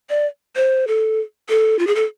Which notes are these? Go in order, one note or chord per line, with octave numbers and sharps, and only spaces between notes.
D5
C5
A4
A4
F4
G#4
A4